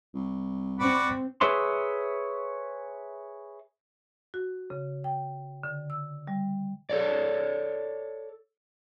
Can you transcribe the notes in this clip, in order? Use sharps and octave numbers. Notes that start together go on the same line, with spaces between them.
C2
C4 F#4 D5 B5
G#4 B4 C#5 E5 C6
F#4
C#3
G5
D3
E6
G3
A4 C#5 D5